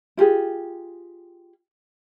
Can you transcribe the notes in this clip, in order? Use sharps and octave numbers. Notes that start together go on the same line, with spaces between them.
E4 F4 G4 G#4